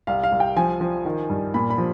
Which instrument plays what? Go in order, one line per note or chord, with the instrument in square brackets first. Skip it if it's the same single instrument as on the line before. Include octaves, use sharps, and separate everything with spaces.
[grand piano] C2 F5
F5
C2
G5
F3 G#5
F3
D#3
G2
A#2 B5
B5
F3